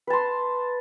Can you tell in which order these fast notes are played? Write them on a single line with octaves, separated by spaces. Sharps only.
B4 A5 C6